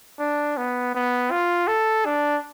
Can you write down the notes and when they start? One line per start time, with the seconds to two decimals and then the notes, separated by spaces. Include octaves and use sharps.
0.19 D4
0.57 B3
0.94 B3
1.31 F4
1.68 A4
2.05 D4